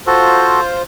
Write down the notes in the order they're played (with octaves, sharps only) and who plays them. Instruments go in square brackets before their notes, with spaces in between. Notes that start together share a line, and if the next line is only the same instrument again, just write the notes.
[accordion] F4 C5 [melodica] F#4 A4